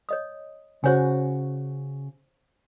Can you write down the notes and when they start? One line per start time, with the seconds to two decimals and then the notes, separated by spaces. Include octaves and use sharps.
0.09 C#5 D#5 D#6
0.84 C#3 F#4 C5 C#5 G#5